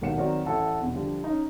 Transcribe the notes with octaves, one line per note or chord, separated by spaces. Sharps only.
D#1 B1 D#3 F#5 C#7 E7
D#3 F#3 C4 A#4 D5
A1 E4 A4 F#5
E2 B2
D3 F3 G3
C#4 D#4